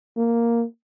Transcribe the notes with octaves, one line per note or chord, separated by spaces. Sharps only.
A#3